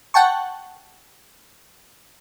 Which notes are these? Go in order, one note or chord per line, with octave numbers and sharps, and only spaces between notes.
F#5 G5 A5 C#6